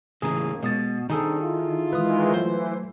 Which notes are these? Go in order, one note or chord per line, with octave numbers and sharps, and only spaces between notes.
D#2 A2 C#3 E3 A#3 C#4 G#4 A#5
B2 G#3 D#6 A6
C3 D#3 G3 D4 D#4 G#4 A4
E4 F4
D#3 E3 G#3 B4 D#6
E3 F#3 A3 C5